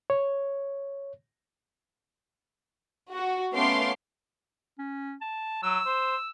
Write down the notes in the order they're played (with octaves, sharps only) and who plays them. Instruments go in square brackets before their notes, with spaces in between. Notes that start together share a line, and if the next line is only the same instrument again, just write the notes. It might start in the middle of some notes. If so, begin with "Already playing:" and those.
[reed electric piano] C#5
[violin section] F#4
A3 B3 C#4 F5 C6 D6
[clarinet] C#4
A5
[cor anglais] F#3 [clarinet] E6
[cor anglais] C5